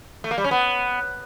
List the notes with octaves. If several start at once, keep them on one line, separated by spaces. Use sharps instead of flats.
A3
A#3
G3
C#4
B3